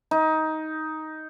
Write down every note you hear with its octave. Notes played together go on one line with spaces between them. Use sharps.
D#4